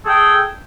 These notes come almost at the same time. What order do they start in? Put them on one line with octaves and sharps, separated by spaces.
A4 G#4 G5